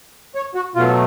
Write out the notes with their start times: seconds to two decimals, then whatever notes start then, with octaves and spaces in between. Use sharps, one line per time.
0.35 C#5
0.55 F#4
0.75 B2 F#3 A3 F4